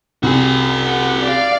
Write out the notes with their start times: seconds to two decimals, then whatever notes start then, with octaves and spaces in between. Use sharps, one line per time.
0.23 C2 F#4 G#4
0.85 F#5
1.23 D5 F5